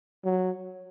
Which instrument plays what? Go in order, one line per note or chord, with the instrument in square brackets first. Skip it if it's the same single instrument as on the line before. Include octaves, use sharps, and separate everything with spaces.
[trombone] F#3